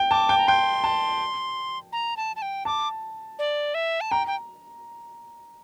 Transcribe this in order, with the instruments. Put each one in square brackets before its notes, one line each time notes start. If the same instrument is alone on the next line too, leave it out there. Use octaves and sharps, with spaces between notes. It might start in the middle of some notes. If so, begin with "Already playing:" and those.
Already playing: [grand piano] G5
[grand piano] A5 [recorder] D6
[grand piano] G5
[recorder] A#5
[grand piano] G5 [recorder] C6
[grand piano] A5
[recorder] A#5
A5
A5
G5
[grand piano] A5 [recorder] D6
[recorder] D5
E5
A5
[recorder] G5 [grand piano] A#5
[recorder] G5